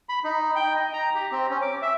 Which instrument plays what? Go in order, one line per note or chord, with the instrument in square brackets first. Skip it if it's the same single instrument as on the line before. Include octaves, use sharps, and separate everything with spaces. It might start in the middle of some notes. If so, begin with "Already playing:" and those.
[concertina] B5
D#4
G5
D#5
A#5
G4
C4
C#4
D6
E5